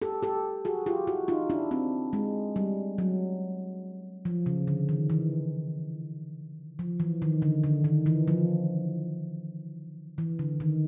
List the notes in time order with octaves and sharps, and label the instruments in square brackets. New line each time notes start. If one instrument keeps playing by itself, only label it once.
[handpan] G4 A4
G4 A4
F#4 G#4
F4 G4
E4 F#4
D#4 F4
D4 E4
C4 D4
G#3
G3
F#3
F3
C#3
D3
D#3
E3
F3
E3
D#3
D3
D3
D#3
E3
F3
E3
D3
D#3